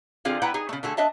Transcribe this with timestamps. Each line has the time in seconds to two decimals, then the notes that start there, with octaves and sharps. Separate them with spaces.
0.25 D3 C4 F4 G#4 F5
0.42 B3 E4 B4 F#5 G5 A#5
0.54 D#4 G#4
0.69 C#3 A3
0.83 D3 A3 G#4 A4
0.97 D4 D#5 E5 A5